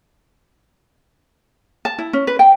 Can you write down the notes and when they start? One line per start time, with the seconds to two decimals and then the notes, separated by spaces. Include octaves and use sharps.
1.85 A5
1.98 E4
2.13 C#4
2.27 B4
2.39 G5